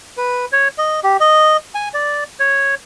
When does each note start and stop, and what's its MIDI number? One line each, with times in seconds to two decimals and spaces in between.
0.17 0.45 71
0.52 0.68 73
0.78 1.00 75
1.03 1.17 67
1.20 1.57 75
1.75 1.89 80
1.94 2.24 74
2.40 2.75 73